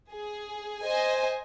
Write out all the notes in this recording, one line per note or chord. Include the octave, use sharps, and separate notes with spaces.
G#4
C5 D#5 G#5